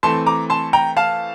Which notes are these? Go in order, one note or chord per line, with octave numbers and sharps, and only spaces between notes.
E3 A3 C4 A5 C6
A#5 D6
A5 C6
G5 A#5
F5 A5